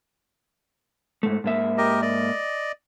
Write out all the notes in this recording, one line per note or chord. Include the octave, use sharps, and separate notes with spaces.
G#2 A3
G#2 A#3 E5
G4 A#4 D#5
D5 D#5